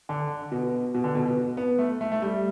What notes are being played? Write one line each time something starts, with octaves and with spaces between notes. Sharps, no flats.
D3
B2
B2
D3
B2
B2
B3
A3
A3
A3
G3